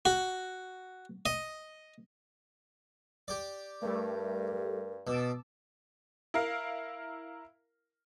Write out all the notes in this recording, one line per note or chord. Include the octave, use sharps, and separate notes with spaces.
F#4
D#5
G4 D5
G2 G3 A3 A#4
B2 A5 D6 E6
E4 A#4 F5